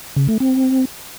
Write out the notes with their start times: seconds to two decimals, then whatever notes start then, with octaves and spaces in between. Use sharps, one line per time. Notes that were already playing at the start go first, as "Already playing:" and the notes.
0.16 C#3
0.28 A3
0.40 C4